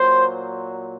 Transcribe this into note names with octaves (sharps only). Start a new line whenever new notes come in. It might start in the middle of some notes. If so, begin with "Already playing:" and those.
Already playing: A#2 F#3 C5